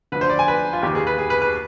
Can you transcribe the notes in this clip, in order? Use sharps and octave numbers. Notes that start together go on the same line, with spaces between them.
D2 D3 F3 B4
C5
D5
G#5
B4
F4
D#2 D#3 G4
G#4
B4
G#4
B4
B4